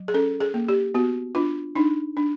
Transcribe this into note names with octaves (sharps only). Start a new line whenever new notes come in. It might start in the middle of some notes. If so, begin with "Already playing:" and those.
Already playing: F#3
G#4
C#4 A4
G#4
A#3
G4
B3 F#4
D4 F4
D4 D#4
D4